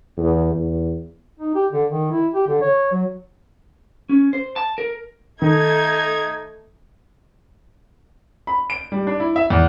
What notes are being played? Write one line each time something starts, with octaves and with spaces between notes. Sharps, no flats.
E2
E2
D#4
G4
D3
D#3
E4
G4
D3
C#5
F#3
C#4
C5
A5
A#4
D#3 A3 D#4 G#6
B5
D7
G3
D4
E4
E5
E2